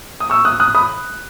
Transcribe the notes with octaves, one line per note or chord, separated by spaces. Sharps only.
D#6
C#6 E6
D#6 F#6
D#6 F#6
B5 D#6